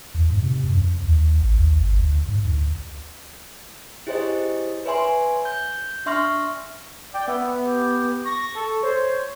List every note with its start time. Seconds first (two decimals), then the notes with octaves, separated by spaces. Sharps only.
0.14 E2
0.30 G#2
0.42 C3
0.64 F#2
0.77 F2
1.04 D#2
1.41 A1
1.56 D#2
1.79 G1
1.99 D2
2.28 G#2
2.45 D2
4.07 E4 G4 G#4 C5 C#5 D#5
4.85 B4 C#5 E5 G#5 C6
5.45 G6
6.06 D4 E5 C6 C#6 F6 A#6
7.14 D5 G5
7.28 B3 E5
7.65 G4
8.26 C#6 A#6
8.55 A4
8.83 C5 C#5